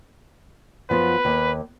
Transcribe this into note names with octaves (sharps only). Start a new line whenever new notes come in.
F#2 F3 B3 B4
D#2